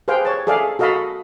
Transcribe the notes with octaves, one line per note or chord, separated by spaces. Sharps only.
G4 G#4 B4 C5 F5 G5
C#5 A5
G#4 A4 D5 E5 F5
F#4 A4 D#5 F5 A5 B5